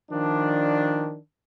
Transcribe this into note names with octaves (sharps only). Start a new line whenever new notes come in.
D#3 F3 D4